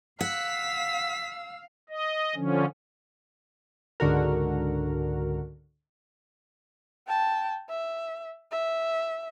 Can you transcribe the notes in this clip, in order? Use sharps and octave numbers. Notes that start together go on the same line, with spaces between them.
F5 F#5 E6 B6
D#5
D3 F3 C#4
C#2 G#2 D3 F#4 A#4
G5 A5
E5
E5